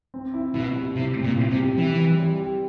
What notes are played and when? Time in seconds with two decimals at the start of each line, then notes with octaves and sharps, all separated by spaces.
0.14 C4
0.34 E4
0.54 B2 E4
0.76 G3
0.96 C3 E4
1.17 C4
1.23 A#2
1.37 E4
1.50 C3
1.58 G4
1.78 E3 E4
1.99 G3
2.20 G3
2.40 G4